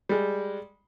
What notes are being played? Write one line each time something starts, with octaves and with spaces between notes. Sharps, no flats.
G3 G#3